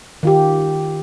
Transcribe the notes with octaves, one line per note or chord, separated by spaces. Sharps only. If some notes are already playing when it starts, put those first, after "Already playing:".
D#3 F4 G4